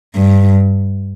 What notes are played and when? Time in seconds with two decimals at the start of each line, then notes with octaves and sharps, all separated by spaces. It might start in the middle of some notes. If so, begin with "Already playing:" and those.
0.16 G2